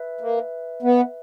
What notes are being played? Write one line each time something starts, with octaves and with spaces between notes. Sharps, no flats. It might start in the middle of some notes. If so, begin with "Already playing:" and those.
Already playing: B4 E5
A#3
B3